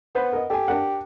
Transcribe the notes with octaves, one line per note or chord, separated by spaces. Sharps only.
B3 B4 C5
A#4 D#5
G4 A4 G#5
D4 A#4 F#5